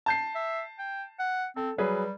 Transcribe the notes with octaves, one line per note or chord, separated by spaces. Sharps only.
A5 G6 C7
E5
G5
F#5
C4 A4
F#3 G3 G#4 B4